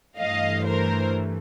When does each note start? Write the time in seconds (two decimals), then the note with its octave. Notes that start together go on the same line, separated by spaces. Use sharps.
0.18 G2 E3 A3 D#5 F5
0.65 A#4 C5